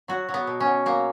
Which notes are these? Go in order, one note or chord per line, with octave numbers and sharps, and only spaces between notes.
F#3 F#4
F#3
B3
B2
C#4
B2
F#3 A#3